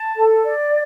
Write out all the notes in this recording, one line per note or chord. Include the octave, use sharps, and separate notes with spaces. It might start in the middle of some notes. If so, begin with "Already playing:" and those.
Already playing: A5
A4
D5